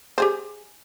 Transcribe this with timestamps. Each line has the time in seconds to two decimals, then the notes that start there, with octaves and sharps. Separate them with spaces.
0.18 G4 G#4 C5